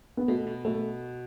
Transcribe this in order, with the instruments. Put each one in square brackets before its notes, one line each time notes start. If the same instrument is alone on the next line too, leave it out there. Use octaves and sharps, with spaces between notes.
[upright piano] B3
[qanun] B2 [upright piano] A3
[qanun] B2
[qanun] B2 [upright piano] A3